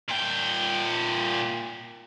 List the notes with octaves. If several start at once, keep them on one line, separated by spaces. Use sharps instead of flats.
A#2 G5